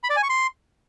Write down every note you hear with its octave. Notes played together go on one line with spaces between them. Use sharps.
B5
D5
G#5
C#6
C6